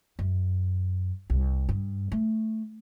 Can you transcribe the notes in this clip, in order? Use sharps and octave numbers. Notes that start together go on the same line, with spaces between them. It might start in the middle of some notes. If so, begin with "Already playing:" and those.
F#2
C2
G2
A3